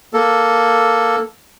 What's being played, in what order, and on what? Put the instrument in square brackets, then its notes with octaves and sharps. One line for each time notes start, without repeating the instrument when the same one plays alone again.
[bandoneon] A#3 A4